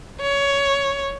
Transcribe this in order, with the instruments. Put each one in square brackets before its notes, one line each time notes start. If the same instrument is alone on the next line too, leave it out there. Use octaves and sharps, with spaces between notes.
[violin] C#5